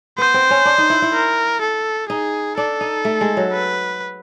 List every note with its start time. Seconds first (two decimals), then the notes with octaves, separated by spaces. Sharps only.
0.18 B3 C5
0.34 C4
0.51 C#4
0.65 D4
0.78 D#4
0.90 E4
1.02 E4
1.13 A#4
1.61 A4
2.09 D#4 G#4
2.57 D4 A4
2.81 D#4
3.05 A3
3.21 G#3
3.37 F#3
3.53 B4